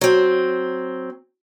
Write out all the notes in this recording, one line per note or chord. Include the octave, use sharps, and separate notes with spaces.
F#3 C4